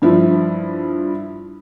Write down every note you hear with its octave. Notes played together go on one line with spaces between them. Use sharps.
G2 F3 E4